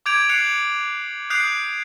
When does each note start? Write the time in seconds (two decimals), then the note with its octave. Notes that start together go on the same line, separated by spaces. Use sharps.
0.06 D6 G6 G#6 D7 F7 F#7
0.29 F#6 C7 C#7 F7 F#7
1.30 D#6 F#6 G6 C7 D7 F7